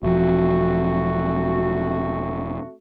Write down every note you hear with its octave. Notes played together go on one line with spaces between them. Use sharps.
E1 F3 A3 C4 F#4